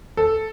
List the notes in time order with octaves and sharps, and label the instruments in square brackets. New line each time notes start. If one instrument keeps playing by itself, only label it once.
[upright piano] A4